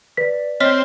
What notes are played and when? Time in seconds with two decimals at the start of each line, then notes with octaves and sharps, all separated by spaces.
0.17 B4 D5 B6
0.60 C4 C#5 D#5 F6 B6